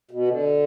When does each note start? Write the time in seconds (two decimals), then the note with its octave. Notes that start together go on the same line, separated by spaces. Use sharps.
0.11 B2
0.28 D3